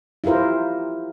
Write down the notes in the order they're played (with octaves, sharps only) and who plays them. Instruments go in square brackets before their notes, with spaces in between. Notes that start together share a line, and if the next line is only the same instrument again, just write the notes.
[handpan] E4 F4 G4 A#4 C5